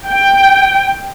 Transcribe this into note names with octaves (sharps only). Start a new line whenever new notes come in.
G5